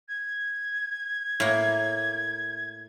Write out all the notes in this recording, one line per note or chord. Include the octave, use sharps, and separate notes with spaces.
G#6
A2 A#3